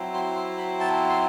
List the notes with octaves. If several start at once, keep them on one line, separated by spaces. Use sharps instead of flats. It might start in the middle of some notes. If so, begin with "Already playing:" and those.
Already playing: F#3 C4 E4
C6
C6
B5
A5
C6